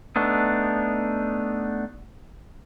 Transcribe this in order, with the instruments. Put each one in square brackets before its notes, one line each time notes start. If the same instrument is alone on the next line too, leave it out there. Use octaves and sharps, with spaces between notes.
[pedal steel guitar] A3 B3 D4 D#4